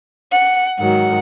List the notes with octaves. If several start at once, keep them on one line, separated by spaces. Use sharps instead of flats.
F#5
G#2 D#3 F#3 F#5